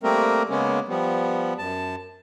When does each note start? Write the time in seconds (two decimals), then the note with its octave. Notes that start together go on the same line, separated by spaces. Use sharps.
0.03 G3 A3 A#3 C4 A#4
0.50 C#3 G#3 A#3 B3 C#4
0.88 F3 G3 B3
1.58 F#2 A5